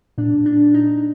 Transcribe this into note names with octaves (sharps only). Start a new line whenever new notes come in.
A#2 D4
D4
D#4